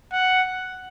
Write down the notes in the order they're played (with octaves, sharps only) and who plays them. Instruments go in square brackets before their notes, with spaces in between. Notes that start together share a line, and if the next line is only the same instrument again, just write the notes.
[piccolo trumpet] F#5